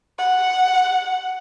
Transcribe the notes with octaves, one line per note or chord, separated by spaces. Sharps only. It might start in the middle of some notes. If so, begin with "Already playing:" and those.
F#5